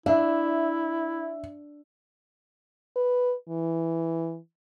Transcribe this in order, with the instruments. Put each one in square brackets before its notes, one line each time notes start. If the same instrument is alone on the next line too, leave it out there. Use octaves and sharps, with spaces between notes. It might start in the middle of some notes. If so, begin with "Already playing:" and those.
[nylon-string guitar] D4 [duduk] E4 [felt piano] E5
[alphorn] B4
E3